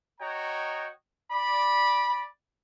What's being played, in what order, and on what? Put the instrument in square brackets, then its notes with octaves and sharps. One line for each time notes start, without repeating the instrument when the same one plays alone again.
[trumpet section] F#4 C#5 D#5 G5 A#5
D5 B5